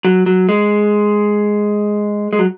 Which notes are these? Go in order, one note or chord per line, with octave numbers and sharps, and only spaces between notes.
F#3
F#3
G#3
G#3
F#3